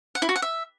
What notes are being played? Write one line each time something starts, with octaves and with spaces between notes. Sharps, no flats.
F#5
E4
F#4
F#5
E5